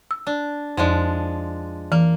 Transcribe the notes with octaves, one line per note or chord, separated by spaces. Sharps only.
E6
D4
F2 F3 G#3 D4
E3 A#3